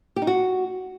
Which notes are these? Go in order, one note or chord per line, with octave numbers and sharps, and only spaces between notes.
G4
D#4
F#4